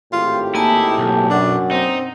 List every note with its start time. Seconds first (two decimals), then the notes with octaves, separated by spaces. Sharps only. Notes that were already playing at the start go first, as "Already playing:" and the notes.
0.13 G#1 A2 F4 G4
0.55 A#3 D#4 E4 G#5 A5
0.98 B1
1.30 F#2 D4 F#5
1.71 C4 D#4